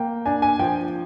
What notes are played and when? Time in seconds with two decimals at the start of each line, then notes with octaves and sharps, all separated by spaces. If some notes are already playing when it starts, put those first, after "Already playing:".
Already playing: A#3 G5
0.25 D4 G#5
0.42 G#5
0.59 F3 G5